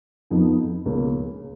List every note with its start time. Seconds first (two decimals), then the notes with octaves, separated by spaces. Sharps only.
0.30 F2 F3 B3 D#4
0.86 C#2 B2 A#3 C#4